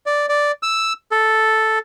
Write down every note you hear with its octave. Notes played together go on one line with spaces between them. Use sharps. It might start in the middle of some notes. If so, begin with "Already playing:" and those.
D5
D5
E6
A4